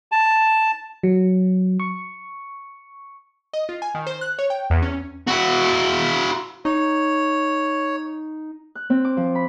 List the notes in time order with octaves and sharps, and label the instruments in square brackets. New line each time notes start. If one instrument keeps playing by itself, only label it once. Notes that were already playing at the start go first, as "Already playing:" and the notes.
[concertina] A5
[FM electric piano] F#3
C#6
[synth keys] D#5
F4
G#5
D#3
C5
F#6
C#5
G5
E2
C#4
[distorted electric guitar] E4 F#4
[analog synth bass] D#4 [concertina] C#5
[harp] F#6
C4
D6
F3
B5